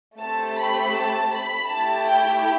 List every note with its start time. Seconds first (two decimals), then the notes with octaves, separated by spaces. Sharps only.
0.20 A3 C4 G4 A5
0.59 B5
0.96 A5
1.34 B5
1.71 A3 E4 G4 A5
2.08 G5